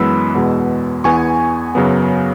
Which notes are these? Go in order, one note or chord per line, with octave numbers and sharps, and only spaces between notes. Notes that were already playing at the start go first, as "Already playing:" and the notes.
Already playing: F#2 E3 G#3 B3 B5 E6
E2 B2 G#3 B3
E2 E3 B3 G#5 C#6
F#2 C#3 F#3 B3